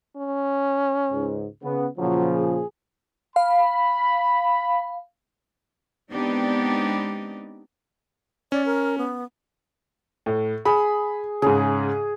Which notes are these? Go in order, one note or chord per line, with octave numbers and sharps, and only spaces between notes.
C#4
C#2 G#2
C#3 B3
A#2 C#3 F3 F#3
G#4
F5 B5
G#3 B3 C4 D4 D#4 G4
C#4 D5
A#4
B3
A2
G#4 B5
G#2 C#3 G#4